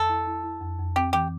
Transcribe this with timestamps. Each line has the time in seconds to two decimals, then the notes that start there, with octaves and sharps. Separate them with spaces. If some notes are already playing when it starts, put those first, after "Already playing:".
Already playing: F2 A4
0.09 E4
0.27 E4
0.44 E4
0.62 F2
0.79 F2
0.96 C4 G4
1.13 E3 G4